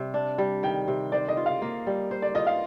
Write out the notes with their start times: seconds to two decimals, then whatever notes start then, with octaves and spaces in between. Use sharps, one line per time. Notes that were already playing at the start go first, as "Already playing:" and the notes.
Already playing: C3 G3
0.14 D4
0.38 G3
0.63 D#3 G5
0.88 C3
1.12 C5 D5
1.28 D#5
1.37 F4
1.46 F5
1.62 A#3
1.87 G3
2.11 C5
2.22 D5
2.35 F4 D#5
2.47 F5